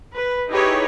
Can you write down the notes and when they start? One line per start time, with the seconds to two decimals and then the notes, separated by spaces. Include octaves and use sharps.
0.13 B4
0.50 D#4 E4 G4 G#4 B4 C#5